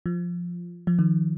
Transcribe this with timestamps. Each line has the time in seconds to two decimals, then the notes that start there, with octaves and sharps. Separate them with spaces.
0.06 F3
0.87 F3
0.99 D#3